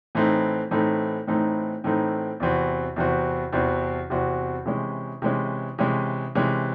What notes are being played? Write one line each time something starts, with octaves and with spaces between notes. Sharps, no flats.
A2 E3 A3 C4 D#4
A2 E3 A3 C4 D#4
A2 E3 A3 C4 D#4
A2 E3 A3 C4 D#4
E2 C3 E3 C4 F#4
E2 C3 E3 C4 F#4
E2 C3 E3 C4 F#4
E2 C3 E3 C4 F#4
C3 E3 G#3 C#4
C3 E3 G#3 C#4
C3 E3 G#3 C#4
C3 E3 G#3 C#4